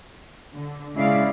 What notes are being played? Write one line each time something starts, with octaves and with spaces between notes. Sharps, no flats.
D3
C#3 G#3 E4 D5 F5